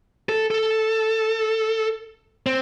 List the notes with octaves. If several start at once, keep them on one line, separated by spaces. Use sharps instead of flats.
A4
A4
C4